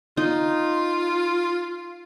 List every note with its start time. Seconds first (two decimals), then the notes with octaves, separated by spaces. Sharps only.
0.17 D#4 F4